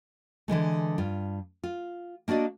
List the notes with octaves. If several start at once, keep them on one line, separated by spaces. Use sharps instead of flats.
D3 E3 G#3 A3
G2 F4
F4
A#3 D4 F#4 D5 D#5